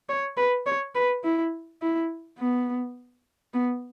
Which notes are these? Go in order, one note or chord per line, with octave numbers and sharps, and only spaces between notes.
C#5
B4
C#5
B4
E4
E4
B3
B3